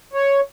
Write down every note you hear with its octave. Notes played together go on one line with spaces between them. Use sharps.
C#5